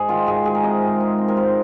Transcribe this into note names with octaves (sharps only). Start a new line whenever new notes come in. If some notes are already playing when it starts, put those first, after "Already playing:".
Already playing: G#2 G#4
D#3 F4
G#2 G#4
G#3 G#4
A#4
C3 D#5
G#3
D#4
C4
A#4
G#2 C5